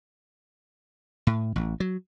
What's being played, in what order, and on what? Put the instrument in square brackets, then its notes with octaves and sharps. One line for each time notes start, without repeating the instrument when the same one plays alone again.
[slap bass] A2
A1
F#3